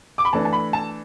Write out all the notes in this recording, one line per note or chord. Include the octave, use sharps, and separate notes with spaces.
D6
B5
E3 A3 D4 A5
A5
B5
A5